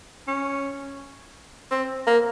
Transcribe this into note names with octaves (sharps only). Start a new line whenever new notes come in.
C#4
C4
A#3